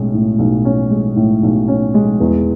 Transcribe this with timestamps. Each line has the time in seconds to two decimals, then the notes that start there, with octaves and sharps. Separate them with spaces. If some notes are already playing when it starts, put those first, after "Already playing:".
Already playing: B1 A2 G#3 C#4
0.14 A2
0.39 B1
0.65 C#4
0.91 G#3
1.16 A2
1.43 B1
1.68 C#4
1.94 G#3
2.20 E2